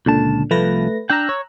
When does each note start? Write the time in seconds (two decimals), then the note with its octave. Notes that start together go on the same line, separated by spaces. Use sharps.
0.06 C#2 A#2 D3 A5
0.51 C2 F3 A3 B4 A#6
1.10 D4 G5 A#5 E6 F#6
1.29 C#5